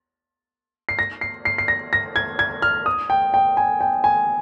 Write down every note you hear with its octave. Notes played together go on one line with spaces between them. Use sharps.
C7
A#6
C7
C7
C7
A#6
A#6
G#6
G#6
F6
D#6
G5
G5
G#5
G5
G#5